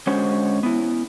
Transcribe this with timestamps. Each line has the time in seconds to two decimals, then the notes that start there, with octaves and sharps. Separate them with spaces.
0.07 D3 G#3 C#4 F#4 C5 C#5
0.63 B3 E4